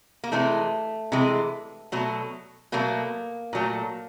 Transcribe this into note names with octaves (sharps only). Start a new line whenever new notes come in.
A#3
C3 E3 G#3 A3
C3 E3 G#3
B2 F#3 A3
B2 F#3 A3 A#3
A#2 F#3 A3